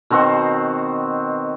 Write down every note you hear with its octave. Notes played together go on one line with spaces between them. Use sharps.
B2 D#3 C4 F#4